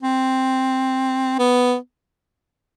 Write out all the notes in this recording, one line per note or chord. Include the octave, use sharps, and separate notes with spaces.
C4
B3